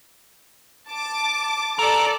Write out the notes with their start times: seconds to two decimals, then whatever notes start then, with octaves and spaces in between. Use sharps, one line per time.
0.88 A5 D6
1.79 G4 A4 A#4 D5 D6